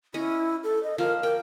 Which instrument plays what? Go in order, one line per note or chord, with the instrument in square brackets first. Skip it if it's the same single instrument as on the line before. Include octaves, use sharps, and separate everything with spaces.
[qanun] C#4 D#5 [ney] E4
[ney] A4
D#5
[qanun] F3 A#3 [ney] A#4
[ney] A#4 [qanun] G5